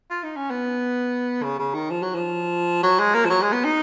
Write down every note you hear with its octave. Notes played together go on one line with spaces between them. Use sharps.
F4
D#4
C#4
B3
C#3
C#3
D#3
F3
F#3
F3
F#3
G#3
A#3
F3
F#3
G#3
B3
D#4